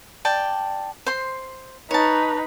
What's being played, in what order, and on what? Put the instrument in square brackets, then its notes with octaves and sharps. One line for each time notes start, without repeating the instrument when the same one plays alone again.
[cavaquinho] D5 G5 A5
C5 C6
[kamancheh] D#4 B4 [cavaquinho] C#5 A5